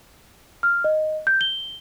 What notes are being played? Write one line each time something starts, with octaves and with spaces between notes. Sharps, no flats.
F6
D#5
G6
G7